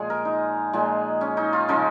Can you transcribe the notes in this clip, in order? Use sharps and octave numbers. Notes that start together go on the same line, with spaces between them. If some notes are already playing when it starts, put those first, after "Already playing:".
Already playing: A#2 F3 G#3 G#4
A#4
D#4
A#2 F3 G#3
C#4
D#4
F4
C#3 F3 G#3 D#4